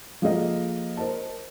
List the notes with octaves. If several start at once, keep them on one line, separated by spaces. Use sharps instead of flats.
F3 A#3 G#4 A4 D#5 F5
A#4 C5 D#5 A5